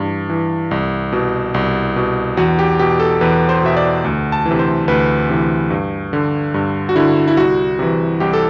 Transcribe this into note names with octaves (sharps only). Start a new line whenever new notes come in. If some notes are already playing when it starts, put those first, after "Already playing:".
Already playing: G2 E3
E3
C2
B2
C2
B2
E2 F#4
G4
B2 G4
A4
E2 B4
C5
B2 E5
D5
D2
A5
E3
C3
C5
D2 B4
C3 E3
G2
D3
G2
F#4
D3 E4
E4
C2 F#4
C3 E3
C2 G4
A4